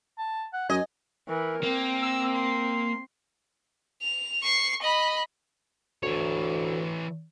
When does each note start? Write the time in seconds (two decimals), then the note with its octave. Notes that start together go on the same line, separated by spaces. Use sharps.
0.18 A5
0.53 F#5
0.70 F#2 D#5 G#5
1.29 E3 A#4
1.64 A#3 C4
2.02 E6
2.35 C6
4.02 F7
4.43 C#6 C7
4.82 D#5 B5
6.03 D2 E3 C#5